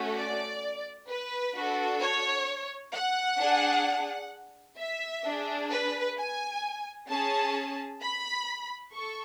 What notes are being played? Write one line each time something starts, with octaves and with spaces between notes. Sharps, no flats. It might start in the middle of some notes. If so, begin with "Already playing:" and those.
Already playing: A3 C#4 F#4 A4
D5
B4
D4 F#4 A4
C#5
F#5
D4 G#4
E5
D4 G#4
B4
G#5
C#4 G#4 A5
B5
A4 C#6